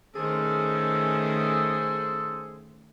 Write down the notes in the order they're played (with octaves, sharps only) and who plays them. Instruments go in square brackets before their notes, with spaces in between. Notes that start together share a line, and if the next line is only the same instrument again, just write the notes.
[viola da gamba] D#3 A3 C#4 [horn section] G#4 C5 [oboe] A4